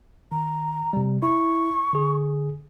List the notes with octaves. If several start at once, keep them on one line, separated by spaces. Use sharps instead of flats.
D#3 A#5
C3 G3
E4 C#6
D3 G#4